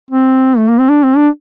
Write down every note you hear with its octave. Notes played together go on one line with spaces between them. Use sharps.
C4
A3
A#3
C4
D4
C4
D4